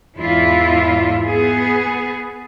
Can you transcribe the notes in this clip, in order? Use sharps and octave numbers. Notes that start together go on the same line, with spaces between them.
E2 G#2 E4 F4
B3 G#4